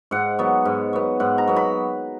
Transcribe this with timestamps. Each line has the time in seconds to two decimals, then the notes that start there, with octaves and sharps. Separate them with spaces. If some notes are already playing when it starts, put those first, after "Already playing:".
0.11 G#2 F#5
0.39 F#3 B3
0.65 G#2
0.93 F#3 B3
1.20 G#2 F#5
1.38 A#5
1.47 F#3 B3
1.56 B5